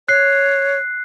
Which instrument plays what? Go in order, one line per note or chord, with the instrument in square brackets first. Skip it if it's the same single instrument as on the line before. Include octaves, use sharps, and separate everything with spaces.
[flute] C#5 [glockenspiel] F#6 C7